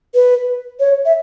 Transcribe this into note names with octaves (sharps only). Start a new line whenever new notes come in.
B4
C#5
E5